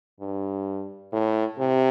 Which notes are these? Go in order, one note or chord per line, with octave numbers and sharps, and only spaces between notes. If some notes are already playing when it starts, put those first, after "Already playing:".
G2
A2
C3